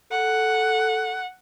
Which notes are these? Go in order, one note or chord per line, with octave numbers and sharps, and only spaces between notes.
A4 F#5